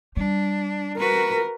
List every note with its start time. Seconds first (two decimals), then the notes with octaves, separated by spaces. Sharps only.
0.17 G3 D4
0.99 F#4 A#4 B4